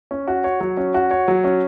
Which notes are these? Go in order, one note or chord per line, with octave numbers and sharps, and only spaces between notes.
C#4
F#4
C#5
F#3
C#4
F#4
C#5
F#3
C#4